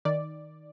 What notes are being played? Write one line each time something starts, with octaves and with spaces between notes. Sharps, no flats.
D#3 D5